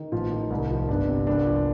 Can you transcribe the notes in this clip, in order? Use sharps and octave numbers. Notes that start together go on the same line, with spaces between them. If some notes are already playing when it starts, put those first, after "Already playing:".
Already playing: D#3
A1 F3 F4
D#3
C2
F3
G1 D4
C3
C2 D4
F3